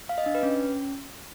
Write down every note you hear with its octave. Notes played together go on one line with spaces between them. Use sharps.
F5
D#5
D4
B4
C#4